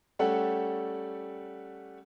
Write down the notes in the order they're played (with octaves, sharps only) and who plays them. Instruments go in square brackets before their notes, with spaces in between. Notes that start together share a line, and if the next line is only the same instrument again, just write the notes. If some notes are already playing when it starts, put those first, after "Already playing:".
[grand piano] G3 A3 C#4 A4 F#5 G5